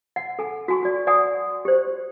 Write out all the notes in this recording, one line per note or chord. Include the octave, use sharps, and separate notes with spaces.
F#5
A4 G#5
F#4 G#5 C#6
F#4 D5
D5 F#5 G#5 C#6 D#6
G4 C5